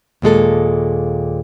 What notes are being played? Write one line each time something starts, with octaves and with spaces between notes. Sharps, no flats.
D#2 A#2 G#3 A4